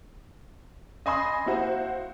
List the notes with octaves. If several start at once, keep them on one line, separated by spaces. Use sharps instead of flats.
D#5 G#5 B5 C6 D#6
A#3 E4 F#4 C5